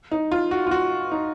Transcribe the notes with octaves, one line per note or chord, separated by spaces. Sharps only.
D#4
F4
F#4
F4
F#4
D#4